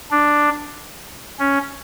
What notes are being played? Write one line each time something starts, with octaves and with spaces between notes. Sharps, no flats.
D4
C#4